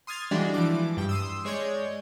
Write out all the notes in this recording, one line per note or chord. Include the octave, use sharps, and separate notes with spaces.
C6 D#6 F6 G#6 A6
E3 G3 G#3 D4 F#4 D5
E3 F3 D6
G2 G5
C6 D#6 E6
G#3 C#5 D5 G6 G#6